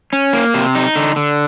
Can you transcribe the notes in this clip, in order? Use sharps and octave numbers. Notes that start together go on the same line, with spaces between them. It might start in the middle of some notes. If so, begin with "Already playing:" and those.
C#4
A#3
C3
D#4
D3
D3